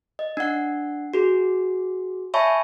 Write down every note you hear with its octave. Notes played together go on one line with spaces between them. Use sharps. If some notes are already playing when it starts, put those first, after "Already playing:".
D#5
D4 F#5
F#4 G#4
C#5 E5 G#5 A5 B5 C#6